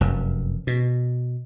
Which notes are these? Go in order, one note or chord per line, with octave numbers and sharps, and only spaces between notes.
F1 F#2
B2